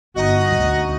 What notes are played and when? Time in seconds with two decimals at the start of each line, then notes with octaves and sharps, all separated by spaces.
0.16 G1 D#4 F#4 D#5
0.55 D2